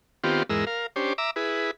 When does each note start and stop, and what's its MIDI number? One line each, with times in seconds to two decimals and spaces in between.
0.24 0.43 51
0.24 0.43 59
0.24 0.43 60
0.24 0.43 65
0.24 0.43 67
0.50 0.65 40
0.50 0.65 44
0.50 0.65 56
0.50 0.65 70
0.50 0.65 88
0.67 0.86 70
0.67 0.86 77
0.96 1.13 61
0.96 1.13 62
0.96 1.13 67
0.96 1.13 72
1.18 1.31 76
1.18 1.31 82
1.18 1.31 86
1.18 1.31 88
1.36 1.71 64
1.36 1.71 68
1.36 1.71 71